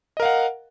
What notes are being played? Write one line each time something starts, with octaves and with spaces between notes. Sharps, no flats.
A#4 D#5 F5 F#5